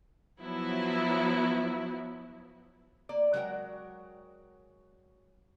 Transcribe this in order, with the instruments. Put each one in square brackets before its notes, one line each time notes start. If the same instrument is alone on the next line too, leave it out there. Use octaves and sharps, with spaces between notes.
[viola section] F3 F#3 B3 E4
[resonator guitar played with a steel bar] A#3 D5
F#3 G#3 F#4 A#4 F#5 G5